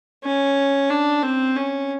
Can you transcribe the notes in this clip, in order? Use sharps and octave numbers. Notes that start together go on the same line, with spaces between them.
C#4
D4
C4
C#4